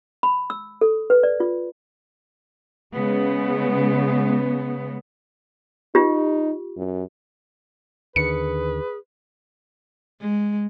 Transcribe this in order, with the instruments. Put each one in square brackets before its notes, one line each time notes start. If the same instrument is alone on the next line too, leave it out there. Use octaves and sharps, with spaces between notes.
[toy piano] B5
E6
A4
B4
D5
F4
[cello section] C#3 G#3 B3
[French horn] D#4 [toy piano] F4 G4
[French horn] F#2
[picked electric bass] D#2 D3 D#3 [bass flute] G#4 [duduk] B4 [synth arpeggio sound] C#7
[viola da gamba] G#3